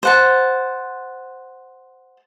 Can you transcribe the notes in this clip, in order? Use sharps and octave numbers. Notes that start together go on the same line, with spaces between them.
C5 F#5 A5